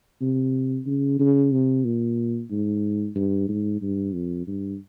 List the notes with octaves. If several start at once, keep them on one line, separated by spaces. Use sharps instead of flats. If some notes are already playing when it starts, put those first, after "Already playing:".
C3
C#3
C#3
C3
A#2
G#2
G2
G#2
G2
F2
G2